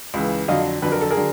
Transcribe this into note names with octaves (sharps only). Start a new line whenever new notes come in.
C#2 C#3 E3
F2 D3 F#3 D#5 F5
F2 D3 F#3 B4
A#4
A4
G#4 A#4
D3 F#3